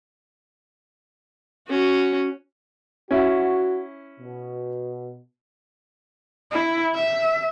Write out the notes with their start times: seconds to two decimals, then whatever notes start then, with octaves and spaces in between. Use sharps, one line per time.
1.68 C#4 F#4
3.11 C#4 E4 F#4
4.20 B2
6.51 E4
6.95 E5